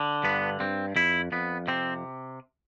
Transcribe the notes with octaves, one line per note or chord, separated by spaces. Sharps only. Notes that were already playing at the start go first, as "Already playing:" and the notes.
Already playing: D3
G2 B3
G2 C4
F2 E4
F2 B3
C3 C4